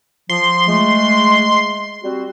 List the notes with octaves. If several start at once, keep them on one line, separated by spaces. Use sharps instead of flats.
F3 C6
G#3 A3
G3 C4 F#4